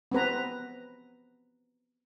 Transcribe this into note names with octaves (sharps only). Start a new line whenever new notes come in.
B3 C4 B4 A#5